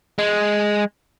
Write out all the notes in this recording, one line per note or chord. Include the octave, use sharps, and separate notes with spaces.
G#3